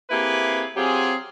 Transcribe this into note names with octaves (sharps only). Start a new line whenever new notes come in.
A#3 C4 E4 G4 G#4 B4
F#3 C4 F4 G4 G#4